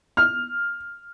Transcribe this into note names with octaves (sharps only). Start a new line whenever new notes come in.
F6